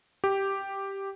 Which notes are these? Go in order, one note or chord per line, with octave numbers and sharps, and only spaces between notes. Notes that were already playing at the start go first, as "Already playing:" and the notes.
G4